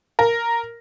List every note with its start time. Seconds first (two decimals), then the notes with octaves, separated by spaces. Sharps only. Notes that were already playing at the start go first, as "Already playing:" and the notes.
0.19 A#4